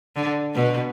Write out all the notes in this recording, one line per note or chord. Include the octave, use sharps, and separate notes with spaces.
D3
B2